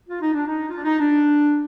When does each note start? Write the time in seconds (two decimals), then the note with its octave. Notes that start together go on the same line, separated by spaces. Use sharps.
0.09 F4
0.22 D#4
0.34 D4
0.47 D#4
0.69 F4
0.77 D4
0.84 D#4
1.00 D4